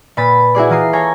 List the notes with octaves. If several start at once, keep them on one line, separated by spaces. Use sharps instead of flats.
A#2 B4 B5 A6
E4 F#4 G#4 D5
E3 F4 A#5 D#6 C7
A4 C#5 G#5 A#5 G#6